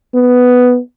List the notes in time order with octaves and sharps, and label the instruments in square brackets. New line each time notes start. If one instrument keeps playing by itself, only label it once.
[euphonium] B3